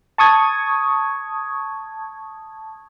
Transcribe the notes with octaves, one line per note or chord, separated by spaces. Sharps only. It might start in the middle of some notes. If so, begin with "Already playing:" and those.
A5 C#6 D#6 G#6